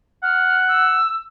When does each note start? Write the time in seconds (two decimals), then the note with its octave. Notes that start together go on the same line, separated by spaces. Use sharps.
0.23 F#5 F6
0.68 E6